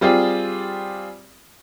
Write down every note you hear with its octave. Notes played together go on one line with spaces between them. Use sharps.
G3 C4 F4 G4 G#4 D5